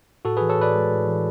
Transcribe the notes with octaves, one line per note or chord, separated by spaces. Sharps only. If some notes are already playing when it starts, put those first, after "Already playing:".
A2 F#4 A4
E3 G#4 B4
A4 C#5
A2 B4 D5
G#3
A2
E3